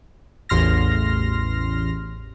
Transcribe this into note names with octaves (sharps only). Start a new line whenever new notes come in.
A1 E2 C6 F6 A#6